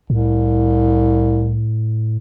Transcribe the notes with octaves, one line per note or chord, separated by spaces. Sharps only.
C2 A2